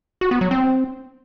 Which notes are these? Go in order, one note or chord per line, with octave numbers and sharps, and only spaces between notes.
F#4
B3
F#3
C4